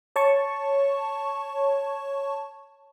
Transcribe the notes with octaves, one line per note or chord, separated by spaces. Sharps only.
C#5 A5 C#6